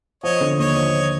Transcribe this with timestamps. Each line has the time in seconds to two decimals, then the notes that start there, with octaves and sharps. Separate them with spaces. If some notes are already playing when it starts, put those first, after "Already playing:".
0.23 F3 C#5 D#5
0.41 D3
0.59 D#2 C#5 D#5
0.76 F3
0.93 F3